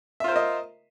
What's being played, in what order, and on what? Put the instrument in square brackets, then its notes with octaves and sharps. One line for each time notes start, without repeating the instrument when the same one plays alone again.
[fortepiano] E5
F4
C5
A#4
D#5